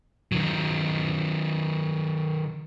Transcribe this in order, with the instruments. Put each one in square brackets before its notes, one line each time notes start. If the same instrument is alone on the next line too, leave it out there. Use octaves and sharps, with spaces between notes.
[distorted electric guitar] D#3 F#3